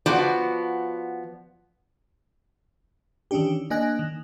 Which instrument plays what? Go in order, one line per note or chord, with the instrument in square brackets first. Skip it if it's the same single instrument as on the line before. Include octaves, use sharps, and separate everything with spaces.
[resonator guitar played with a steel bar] F3 B3 F#4 D5
[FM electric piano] D#3 E3 C#4 D4 G4
A#3 D4 D#5 G#5 F#6 A#6
D#3